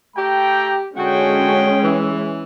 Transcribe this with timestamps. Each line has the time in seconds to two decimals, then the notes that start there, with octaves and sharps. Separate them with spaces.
0.16 A3 G4 G5 A#5
0.97 D3 G#3 C#4 F#4 G#4 G5
1.83 E3